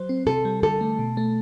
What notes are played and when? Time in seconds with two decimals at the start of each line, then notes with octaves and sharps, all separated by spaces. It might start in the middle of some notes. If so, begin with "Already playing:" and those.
Already playing: F#3 C5
0.09 C4
0.27 C3 A4
0.45 G3
0.63 D3 A4
0.81 A3
0.99 B2
1.17 A3